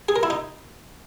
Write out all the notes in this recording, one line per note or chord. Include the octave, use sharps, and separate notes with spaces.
G#4
A#4
E4
D#4